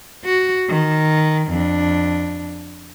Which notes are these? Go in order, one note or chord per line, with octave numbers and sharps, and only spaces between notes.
F#4
D#3
F2 D4